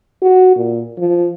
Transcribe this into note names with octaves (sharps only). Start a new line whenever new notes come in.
F#4
A#2
F3